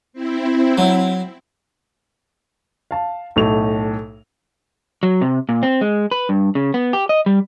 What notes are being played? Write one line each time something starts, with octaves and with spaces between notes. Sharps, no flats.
C4 E4
F#3
F5 A5
B1 A2 A3 F7
F#3
C3
A#2
C4
G#3
B4
G2
C#3
B3
G4
D#5
G3